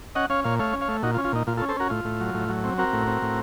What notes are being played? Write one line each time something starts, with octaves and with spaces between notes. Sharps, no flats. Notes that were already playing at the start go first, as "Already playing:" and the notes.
C#4 D#5 F#5
C#4 C#5 F5
A#2 C#5 F5
A3 C#5 F5
C#4
C#5 F5
A3
A#2 D#4 F#4
F4
C#4
F4
A#2 D#4
A#2 F4
F4 A4
C#4
A4 C5
C#4 F#4 A#4
A2 F4
A2
F#3
A2
F#3
C4
C4 F#4 A#4
A2
C4
A2